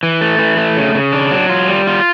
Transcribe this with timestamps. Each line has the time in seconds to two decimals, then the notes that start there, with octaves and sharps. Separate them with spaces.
0.03 E3
0.21 A3
0.39 E3
0.57 A3
0.77 C#3
0.95 C#3
1.12 D4
1.31 F#3
1.49 F4
1.68 G3
1.87 F4